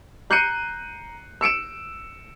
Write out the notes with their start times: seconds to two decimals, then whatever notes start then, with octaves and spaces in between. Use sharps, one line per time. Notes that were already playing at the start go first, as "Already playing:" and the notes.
0.30 A#5 F#6 G6 C7 C#7 D#7
1.41 E6 C#7 D7 E7